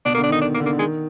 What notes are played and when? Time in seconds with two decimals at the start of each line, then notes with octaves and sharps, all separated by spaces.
0.06 B2 D4
0.14 A#3
0.17 D3
0.24 D4
0.29 D#3 D#4
0.41 D4
0.54 A#3
0.60 D3
0.66 A#3
0.73 D3
0.78 D#3 G#3